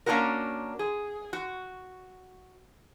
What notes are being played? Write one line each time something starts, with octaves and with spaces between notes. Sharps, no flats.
A#3 C#4 D4 E4 F#4 A#4
G#4
F#4